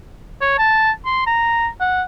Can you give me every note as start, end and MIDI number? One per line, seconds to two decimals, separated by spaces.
0.41 0.57 73
0.59 0.91 81
1.05 1.26 84
1.26 1.67 82
1.80 2.03 78